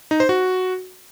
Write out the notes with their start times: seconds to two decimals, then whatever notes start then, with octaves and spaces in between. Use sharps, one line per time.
0.11 D#4
0.20 C5
0.29 F#4